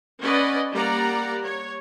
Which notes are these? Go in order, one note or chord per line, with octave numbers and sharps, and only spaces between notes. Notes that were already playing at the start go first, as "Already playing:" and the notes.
C#4 B4 D5 D#5 F#5
G3 A#3 D5 F#5 A#5
C#5